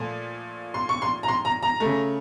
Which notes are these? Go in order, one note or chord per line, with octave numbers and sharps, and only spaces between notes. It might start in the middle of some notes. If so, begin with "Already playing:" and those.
Already playing: A#2 F3 A3
C6
C#6
C6
A#5
C6
A#5
A#5
C#3 A3